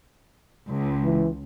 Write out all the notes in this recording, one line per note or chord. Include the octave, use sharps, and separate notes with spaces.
C#2
E3